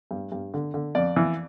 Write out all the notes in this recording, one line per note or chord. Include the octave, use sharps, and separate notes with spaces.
G2
G2
D3
D3
F2 D5
E3